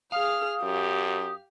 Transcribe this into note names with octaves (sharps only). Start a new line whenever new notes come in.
G#4 F5 D#6 F6
F#2 G4